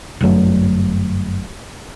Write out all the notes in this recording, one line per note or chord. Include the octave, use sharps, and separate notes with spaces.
G1 F#2 F#3 A3